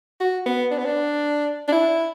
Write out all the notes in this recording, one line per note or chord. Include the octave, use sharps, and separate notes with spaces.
F#4
B3
D4
B3
D4
D4
E4